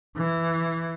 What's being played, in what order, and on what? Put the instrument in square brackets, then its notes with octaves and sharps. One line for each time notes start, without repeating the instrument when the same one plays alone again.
[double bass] E3